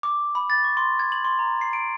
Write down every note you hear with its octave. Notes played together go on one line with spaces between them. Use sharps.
D6
B5
A6
C#6
C6
G#6
F#7
C6
A#5
C7
D7